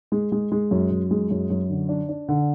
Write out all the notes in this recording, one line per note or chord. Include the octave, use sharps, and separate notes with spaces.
G#3
G#3
G#3
F#2
F#2
G#3
F#2
F#2
D3
D4
D4
D3